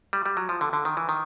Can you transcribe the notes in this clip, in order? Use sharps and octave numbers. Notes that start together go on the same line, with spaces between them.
G3
G3
F#3
F3
D3
D3
D#3
E3
D#3